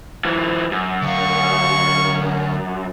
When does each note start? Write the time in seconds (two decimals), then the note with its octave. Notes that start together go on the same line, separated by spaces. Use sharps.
0.25 E3 F#3
0.72 F#2
1.02 D2 F5 C#6